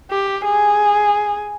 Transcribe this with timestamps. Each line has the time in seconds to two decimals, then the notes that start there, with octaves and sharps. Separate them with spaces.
0.11 G4
0.45 G#4